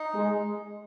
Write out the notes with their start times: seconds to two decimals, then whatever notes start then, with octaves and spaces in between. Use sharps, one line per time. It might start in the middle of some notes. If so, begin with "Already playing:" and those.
Already playing: D#4
0.14 G#3